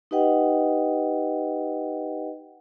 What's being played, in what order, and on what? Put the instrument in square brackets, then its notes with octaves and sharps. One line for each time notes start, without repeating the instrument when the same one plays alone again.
[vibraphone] D#4 G4 B4 D#5 F#5 G5